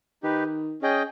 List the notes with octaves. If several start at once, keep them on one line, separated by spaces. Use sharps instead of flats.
D#3 D#4 G4 B4
C#4 G#4 D#5 G5